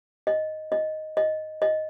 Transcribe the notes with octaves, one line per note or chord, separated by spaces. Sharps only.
D#5
D#5
D#5
D#5